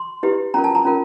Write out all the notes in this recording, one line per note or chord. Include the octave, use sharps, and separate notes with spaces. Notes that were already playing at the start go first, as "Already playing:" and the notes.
Already playing: C6
E4 G4 B4
C#4 F4 A#4 A#5
A5
A#5
C#4 F4 A#4